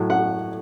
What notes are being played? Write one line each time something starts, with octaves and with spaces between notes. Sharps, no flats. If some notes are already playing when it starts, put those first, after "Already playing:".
Already playing: A2 F#3
F#5